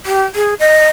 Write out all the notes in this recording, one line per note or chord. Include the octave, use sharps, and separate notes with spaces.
G4
G#4
D#5